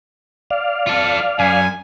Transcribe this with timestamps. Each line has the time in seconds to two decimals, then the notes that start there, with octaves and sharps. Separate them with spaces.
0.51 D5 F5
0.87 F4 A4
1.39 F#2 G#5